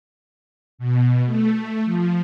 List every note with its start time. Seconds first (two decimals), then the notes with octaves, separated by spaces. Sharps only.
0.78 B2
1.26 A3
1.85 F3